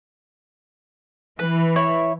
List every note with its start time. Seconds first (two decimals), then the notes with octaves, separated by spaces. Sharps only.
1.39 E3 B4
1.76 E4 C#5